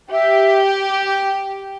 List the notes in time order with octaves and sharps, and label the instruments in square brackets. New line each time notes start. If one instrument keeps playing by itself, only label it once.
[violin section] G4 [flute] E5